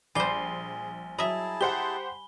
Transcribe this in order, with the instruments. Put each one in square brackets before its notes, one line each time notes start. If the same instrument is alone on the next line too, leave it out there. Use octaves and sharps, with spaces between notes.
[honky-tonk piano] A#1 C7 [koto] G3 C5 [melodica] G#4 [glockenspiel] G#5 G7
[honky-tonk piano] F#3 [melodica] E4 G#4 A5 [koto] D#5 E5 [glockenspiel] B5
[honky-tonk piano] G4 C5 F#5 [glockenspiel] G7